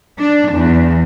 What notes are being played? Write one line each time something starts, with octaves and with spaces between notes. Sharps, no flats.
D4
E2